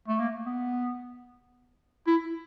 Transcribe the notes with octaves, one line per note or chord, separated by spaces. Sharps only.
A3
A#3
B3
E4